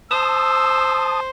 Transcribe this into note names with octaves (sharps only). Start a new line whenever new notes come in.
C5 A5 D#6 E6